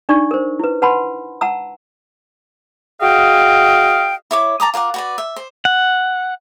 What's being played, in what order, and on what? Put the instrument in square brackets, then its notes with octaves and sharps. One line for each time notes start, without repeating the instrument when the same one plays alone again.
[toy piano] D4 D#4 D5 C#6
A#4 C5
E4 B4
B4 F#5 A5 B5 C6
F#5 A5 A#5 E6
[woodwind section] F#4 G#4 D#5 F5 G5
[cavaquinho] E4 C#5 D6
A5 A#5 D6 D#6
F4 A#4 F#5 D6
F#4 B4 D5
E5
C5
[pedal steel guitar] F#5